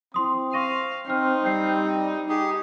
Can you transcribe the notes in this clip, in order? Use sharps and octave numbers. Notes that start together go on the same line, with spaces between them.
C4 E4 C6 D#6
F5 C#6 A#6 D#7
C4 D#4 F6 C7
G3 C4 G6 C7
D#4 G4 G#4